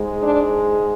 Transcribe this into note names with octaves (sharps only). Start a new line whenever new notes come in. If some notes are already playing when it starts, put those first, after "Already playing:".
Already playing: G#2 G#3
D4